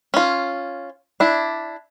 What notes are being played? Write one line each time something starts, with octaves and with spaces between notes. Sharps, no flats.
C#4 F4
D4 E4